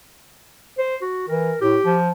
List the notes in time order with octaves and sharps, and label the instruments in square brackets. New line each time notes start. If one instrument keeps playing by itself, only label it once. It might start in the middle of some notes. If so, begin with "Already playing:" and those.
[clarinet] C5
F#4
[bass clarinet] E3 [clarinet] A#4
[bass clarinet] A2 [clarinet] G4
[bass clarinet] F3